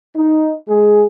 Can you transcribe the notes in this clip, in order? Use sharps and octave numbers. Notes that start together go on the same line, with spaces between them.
D#4
G#3 G#4